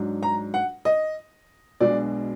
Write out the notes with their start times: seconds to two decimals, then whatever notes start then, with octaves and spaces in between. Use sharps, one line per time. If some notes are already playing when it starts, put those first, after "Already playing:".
Already playing: G#2 F#3 D4
0.23 A#5
0.54 F#5
0.85 D#5
1.80 B1 B2 G#3 D4 D5